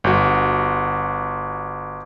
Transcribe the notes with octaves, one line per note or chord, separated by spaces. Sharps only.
G1 F#4